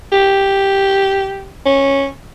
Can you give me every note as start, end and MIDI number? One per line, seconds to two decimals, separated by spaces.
0.12 1.51 67
1.65 2.06 61